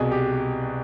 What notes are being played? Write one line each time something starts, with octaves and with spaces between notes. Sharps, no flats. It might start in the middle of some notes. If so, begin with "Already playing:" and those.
Already playing: C2 B2 G#4
G4